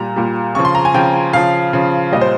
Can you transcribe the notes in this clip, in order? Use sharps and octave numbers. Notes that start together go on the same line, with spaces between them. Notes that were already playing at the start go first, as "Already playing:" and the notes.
Already playing: A#2 G3 A#5
A#2 G3
C#3 F3 C#6
C6
A#5
G#5
C#3 F3 G5
C#3 F3 F5
C#3 F3
A#2 G3 D#5
C5